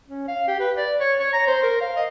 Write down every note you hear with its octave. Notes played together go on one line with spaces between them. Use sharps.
C#4
F5
G4
B4
D5
C#5
C#5
A#5
C5
A#4
F5
D#5